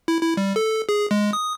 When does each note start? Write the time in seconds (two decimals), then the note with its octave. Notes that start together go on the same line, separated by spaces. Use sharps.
0.08 E4
0.22 E4
0.37 G3
0.56 A4
0.89 G#4
1.11 G#3
1.33 D#6